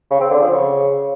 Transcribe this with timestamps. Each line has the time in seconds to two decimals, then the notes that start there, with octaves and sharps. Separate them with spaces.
0.10 C#3
0.21 C4
0.31 D3
0.41 F3
0.51 C#3